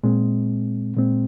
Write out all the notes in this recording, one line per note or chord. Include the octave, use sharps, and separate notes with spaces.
A#2 G#3 C4
A#2 G#3 C4